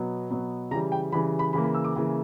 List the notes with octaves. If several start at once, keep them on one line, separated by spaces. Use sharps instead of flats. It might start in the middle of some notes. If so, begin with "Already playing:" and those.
Already playing: B2 F#3 B3
B2 F#3 B3
C#3 E3 G3 A#5
G5
C#3 E3 G3 B5
B5
C#3 E3 A#3 B5
B5
E6
D6
C#3 E3 A#3